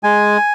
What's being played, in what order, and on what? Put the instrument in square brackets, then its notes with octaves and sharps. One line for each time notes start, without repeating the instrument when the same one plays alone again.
[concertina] G#3 G#5